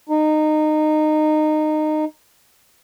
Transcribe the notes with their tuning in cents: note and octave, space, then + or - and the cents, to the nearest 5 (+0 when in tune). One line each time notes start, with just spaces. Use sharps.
D#4 -20